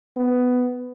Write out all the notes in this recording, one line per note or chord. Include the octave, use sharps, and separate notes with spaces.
B3